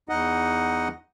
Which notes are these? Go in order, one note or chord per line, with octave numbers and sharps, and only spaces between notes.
E2 D#4 D#5 F#5